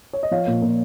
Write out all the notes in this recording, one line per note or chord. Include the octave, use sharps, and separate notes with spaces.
C#5
D#5
F3 C#5 F5
A#2
A#2